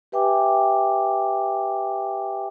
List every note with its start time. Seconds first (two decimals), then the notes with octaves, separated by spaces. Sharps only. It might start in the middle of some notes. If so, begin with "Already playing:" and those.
0.12 G4 B4 E5 G5 G#5 D6